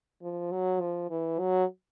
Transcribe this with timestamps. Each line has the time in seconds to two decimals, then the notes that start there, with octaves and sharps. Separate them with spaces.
0.22 F3
0.51 F#3
0.81 F3
1.10 E3
1.39 F#3